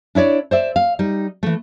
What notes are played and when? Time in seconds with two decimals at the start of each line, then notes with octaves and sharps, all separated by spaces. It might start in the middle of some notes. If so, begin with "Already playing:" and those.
0.15 D4 E4 C#5 D5
0.51 C5 D5 E5
0.76 F5
0.99 G3 D#4
1.43 E3 A3